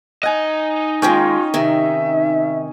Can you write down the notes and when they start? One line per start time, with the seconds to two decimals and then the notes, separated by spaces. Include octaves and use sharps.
0.23 D#4 D#5 F#5 G#5
1.02 D#3 G#3 A#3 C#4 F4 G5
1.54 C3 D#3 E5